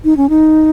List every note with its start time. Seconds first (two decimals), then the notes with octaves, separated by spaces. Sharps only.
0.04 D#4
0.17 C#4
0.29 D#4